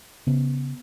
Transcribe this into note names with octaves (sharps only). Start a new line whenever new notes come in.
C#3 B3